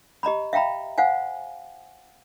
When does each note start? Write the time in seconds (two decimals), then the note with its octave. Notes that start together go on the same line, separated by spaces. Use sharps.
0.23 G4 D#5 A#5 B5
0.53 E5 F5 G5 A#5 B5
0.98 C5 F5 F#5 G#5